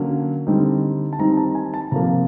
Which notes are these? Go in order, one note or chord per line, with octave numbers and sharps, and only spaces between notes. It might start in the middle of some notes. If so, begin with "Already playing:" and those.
Already playing: D3 F#3 A#3 C#4
D3 G3 C4 D#4
A5
D#3 G3 C4 D#4 A#5
A5
G#5
A5
C3 F3 A#3 A#5